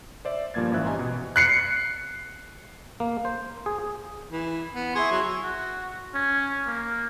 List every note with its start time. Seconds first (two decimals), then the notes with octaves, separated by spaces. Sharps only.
0.25 C5 D5 E5
0.54 G2 A#2 F3 A#3 G#6 A6
0.72 G#1 E3 C#4 C5 E5 F#6
0.85 G4 D#5 G#5 A#5 C6
0.99 B2
1.36 F#6 C7 C#7
3.00 A#3
3.25 C5
3.66 G#4
4.32 E3
4.75 B3
4.95 E4 G#4 C6 C#6
5.11 F#3
5.43 F#4
6.14 C#4
6.66 A#3